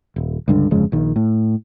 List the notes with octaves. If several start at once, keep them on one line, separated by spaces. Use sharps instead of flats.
D#1
C#2 G2 D3
G1 F2 C#3 G#3
A#1 D#3
A2